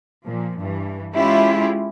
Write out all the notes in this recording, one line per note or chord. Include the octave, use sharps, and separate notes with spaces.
A#2 F3
G2 E3
G#3 C#4 E4 F4 G4